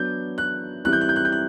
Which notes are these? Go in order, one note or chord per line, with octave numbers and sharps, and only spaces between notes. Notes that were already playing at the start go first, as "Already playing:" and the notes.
Already playing: F#3 B3 D4 G6
F#6
E3 G3 C4 E4 F#6
G6
F#6
G6
F#6
G6
F#6